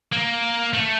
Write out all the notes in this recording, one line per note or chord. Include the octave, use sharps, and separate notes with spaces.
A#3
A3